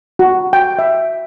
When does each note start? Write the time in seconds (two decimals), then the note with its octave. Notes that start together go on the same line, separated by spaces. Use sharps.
0.19 F#4
0.53 G5
0.79 E5